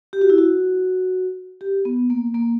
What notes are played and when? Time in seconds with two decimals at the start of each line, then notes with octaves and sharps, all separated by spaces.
0.13 G4
0.21 F#4
0.30 E4
0.38 F#4
1.61 G4
1.85 B3
2.10 A#3
2.35 A#3